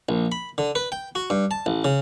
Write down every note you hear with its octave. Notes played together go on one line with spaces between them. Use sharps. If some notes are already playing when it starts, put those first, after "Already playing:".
A#1
B5
D3
B4
G5
F#4
G2
A5
A1
C#3